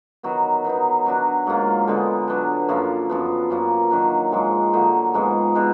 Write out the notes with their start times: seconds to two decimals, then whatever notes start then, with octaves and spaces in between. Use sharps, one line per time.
0.23 D#3 F#3 B3
0.65 F#3 B3 D#4
1.06 F#3 D4 F#4
1.47 G#2 F#3 A#3 F4
1.87 D3 G#3 B3 D#4
2.28 F#3 B3 D4
2.69 F#2 F3 A#3
3.09 F#2 F3 B3
3.50 F#2 F3 A#3
3.91 D#3 F#3 D4
4.32 G#2 F3 G#3
4.73 D3 F#3 A#3 D#4
5.14 G#2 F3 G#3 B3
5.55 B2 G#3 D4